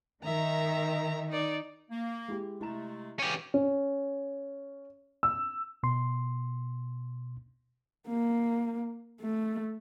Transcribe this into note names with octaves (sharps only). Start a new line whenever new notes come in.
D#3 E5 A#5
D#4 D5
A#3
G#3 E4 G4
C3 G#3 A3 E4 A#5 E7
A#2 C#3 E3 C#4 G4
C#4
E6
B2 C6
A#3
A3